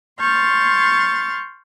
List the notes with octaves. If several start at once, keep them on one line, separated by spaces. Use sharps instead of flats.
C6 C#6 F6 G6 A6